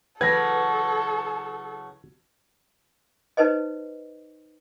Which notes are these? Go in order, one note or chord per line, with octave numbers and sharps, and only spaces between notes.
C#3 E3 F#3 A4 B4 G#6 A#6
D#4 B4 C5 D#5